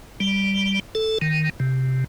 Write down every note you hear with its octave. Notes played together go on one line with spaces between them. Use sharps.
G3
A4
D#3
C3